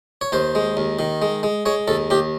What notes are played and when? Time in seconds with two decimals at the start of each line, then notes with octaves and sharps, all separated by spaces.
0.21 C#5
0.32 D#2 C5
0.55 G#3
0.77 D#2
0.99 D#3
1.22 G#3
1.43 G#3
1.66 G#3 C#5
1.88 D#2 A4
2.10 D#2 G4